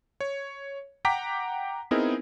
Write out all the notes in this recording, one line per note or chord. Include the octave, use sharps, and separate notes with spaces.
C#5
F#5 G5 A#5 D6 B6
B3 C4 D#4 E4 G#4 A#4